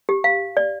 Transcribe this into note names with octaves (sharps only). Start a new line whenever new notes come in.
G4
F5
D5